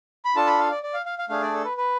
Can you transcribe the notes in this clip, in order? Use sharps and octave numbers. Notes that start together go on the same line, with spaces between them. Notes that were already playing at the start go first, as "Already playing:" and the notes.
B5
D4 F4 A4 A5
B5
F5
D5
D5
F5
F5
F5
A3 D4 G#4 F5
D5
A4
B4
B4